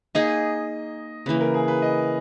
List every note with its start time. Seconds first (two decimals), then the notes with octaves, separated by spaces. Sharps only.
0.15 A#3 D#4 G#4 D#5
1.26 C#3 E3 A#3 B4
1.41 A#4
1.54 G#4
1.68 B4
1.82 D#5